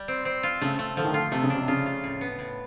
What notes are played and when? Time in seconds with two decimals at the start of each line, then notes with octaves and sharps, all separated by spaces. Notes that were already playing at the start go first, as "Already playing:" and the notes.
Already playing: G3
0.08 C4
0.25 C4
0.43 F4
0.61 C#3 A3
0.79 A3
0.97 D3 F3
1.04 D#3
1.11 D3
1.14 F4
1.32 C3 A3
1.43 C#3
1.50 C3 D4
1.61 C3
1.68 C#3 F4
1.86 F4
2.04 A2
2.21 B3
2.39 A2